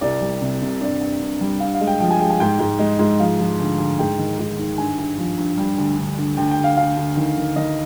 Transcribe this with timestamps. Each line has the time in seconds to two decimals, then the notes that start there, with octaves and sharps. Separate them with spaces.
0.01 C2 D5
0.21 G3
0.41 C3
0.61 C3
0.81 G2 D5
1.01 G2
1.21 G2
1.40 G3
1.60 G2 F5
1.74 F5
1.81 G#3
1.87 G5
2.00 F3 G5
2.11 G#5
2.21 G#3 G5
2.30 G#5
2.40 G#2 G5
2.59 G#2
2.79 G#3
2.99 G#2
3.20 F3 F5
3.39 F3
3.59 D2
3.78 D2
3.99 G#2 G5
4.19 D#3
4.39 G#2
4.58 D#3
4.78 G2 G#5
4.99 G2
5.18 F3
5.38 G2
5.57 G3 G5
5.78 D2
5.98 D2
6.18 D2
6.37 D2 G5
6.51 G5
6.57 D2
6.64 F5
6.77 D2 F5
6.97 D2
7.17 D#3
7.37 D#3
7.56 D#3 D#5